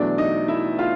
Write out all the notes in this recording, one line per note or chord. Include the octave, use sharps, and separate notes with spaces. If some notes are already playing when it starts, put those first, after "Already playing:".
Already playing: E2 B2 F#3 A3 D4 D5
D#4 D#5
E4 E5
F4 F5